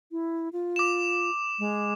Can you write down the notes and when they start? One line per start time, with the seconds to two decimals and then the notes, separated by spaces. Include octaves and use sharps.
0.12 E4
0.53 F4
0.76 D6 E7
1.59 G#3